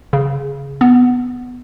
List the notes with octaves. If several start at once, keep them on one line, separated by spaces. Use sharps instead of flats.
C#3
B3